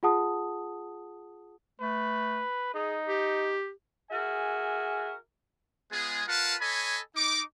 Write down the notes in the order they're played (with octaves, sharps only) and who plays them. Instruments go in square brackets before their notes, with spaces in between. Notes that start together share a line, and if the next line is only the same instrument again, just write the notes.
[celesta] F4 G#4 F#5 A5 D#6
[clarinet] A3 [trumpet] B4
[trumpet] D#4 [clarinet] G#4
[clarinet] G4
[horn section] F#4 G#4 A#4 E5 G#5
[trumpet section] G#3 B3 F4 G#4
F4 A#4 B4 F5 F#5 A5
A4 C#5 D#5 G#5 B5
D#4 D6